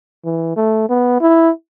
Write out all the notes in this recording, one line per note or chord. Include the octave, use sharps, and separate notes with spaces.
E3
A3
B3
E4